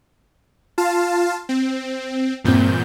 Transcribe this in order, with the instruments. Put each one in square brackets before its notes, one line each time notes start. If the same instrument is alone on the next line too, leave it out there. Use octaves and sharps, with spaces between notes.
[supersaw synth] F4 F5 A5
C4
[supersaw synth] E2 A#2 G6 [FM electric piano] G2 C4